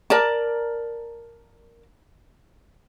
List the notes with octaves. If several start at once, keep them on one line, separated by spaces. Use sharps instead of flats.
A#4 D5 A5